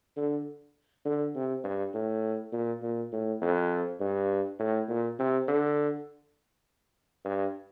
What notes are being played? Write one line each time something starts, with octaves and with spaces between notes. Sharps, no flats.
D3
D3
C3
G2
A2
A#2
A#2
A2
F2
G2
A2
A#2
C3
D3
G2